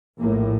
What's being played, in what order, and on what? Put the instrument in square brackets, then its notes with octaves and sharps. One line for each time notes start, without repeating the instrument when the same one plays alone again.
[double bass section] A#1 A2 A#3